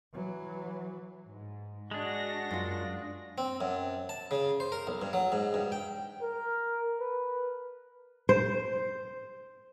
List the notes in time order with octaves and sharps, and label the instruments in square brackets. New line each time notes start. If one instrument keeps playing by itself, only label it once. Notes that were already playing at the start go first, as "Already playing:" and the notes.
[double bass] E3 F#3
[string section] G#2
[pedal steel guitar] G#3 D4 [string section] F#4 A#6
[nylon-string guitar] F#2 F4
[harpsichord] C4
F#2
A5
C#3
C5
A#4
B1
G2
F#3
G#2
G2
G5
[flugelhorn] A#4
B4
[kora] C5